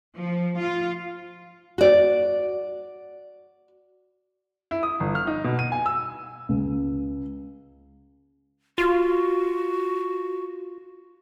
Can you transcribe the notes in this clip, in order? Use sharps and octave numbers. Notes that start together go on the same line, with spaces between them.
F3
F4
F#4 D5
E4
D#6
G1
F6
D#4
B2
D#7
G#5
E6
C#2
F4 F#4